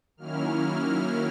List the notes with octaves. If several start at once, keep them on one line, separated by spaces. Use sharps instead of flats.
D#3 F#3 A#3 C#4 E4 F6